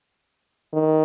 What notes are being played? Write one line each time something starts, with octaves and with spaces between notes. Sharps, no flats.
D#3